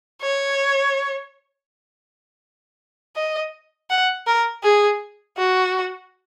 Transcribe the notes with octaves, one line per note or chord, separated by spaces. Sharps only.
C#5
D#5
F#5
A#4
G#4
F#4